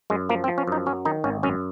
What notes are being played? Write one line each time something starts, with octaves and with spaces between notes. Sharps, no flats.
F#2 G#3
F3 A#3
C4
F3
C#4
F#2 D#4
F#3 C#4
D#3 D#4
G#1 C#4
F#2 C#4